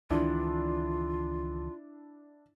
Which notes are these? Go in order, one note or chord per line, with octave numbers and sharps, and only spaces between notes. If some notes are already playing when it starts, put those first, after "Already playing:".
C#2 D#3 E3 D4 E4 F4